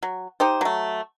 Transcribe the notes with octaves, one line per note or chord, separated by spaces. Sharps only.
F#3
D#4 G4 C5
F#3 A3